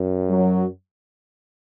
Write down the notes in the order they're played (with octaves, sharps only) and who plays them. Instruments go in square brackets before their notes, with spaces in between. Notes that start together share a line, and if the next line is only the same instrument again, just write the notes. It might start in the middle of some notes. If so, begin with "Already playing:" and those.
Already playing: [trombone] F#2
[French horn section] F#3